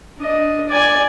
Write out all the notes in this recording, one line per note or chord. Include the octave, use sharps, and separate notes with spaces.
D4 D#5
D5 G#5